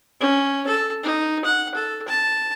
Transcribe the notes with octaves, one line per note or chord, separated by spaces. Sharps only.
C#4
A4
D#4
F#5
A4
A5